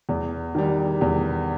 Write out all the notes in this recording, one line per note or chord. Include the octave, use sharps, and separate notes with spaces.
E2
D#3 G3
E2